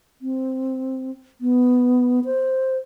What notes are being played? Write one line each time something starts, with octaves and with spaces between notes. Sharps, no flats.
C4
B3
C5